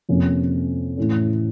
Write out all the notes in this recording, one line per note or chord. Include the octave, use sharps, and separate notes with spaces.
F2 C3 F3 A#3 C#4
A2 E3 A3 C#4